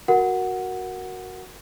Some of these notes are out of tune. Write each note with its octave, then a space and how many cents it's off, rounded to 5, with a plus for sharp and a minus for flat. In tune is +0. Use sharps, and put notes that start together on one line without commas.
F#4 +0 A#4 +0 F#5 +0